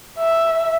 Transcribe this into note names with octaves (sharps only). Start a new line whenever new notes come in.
E5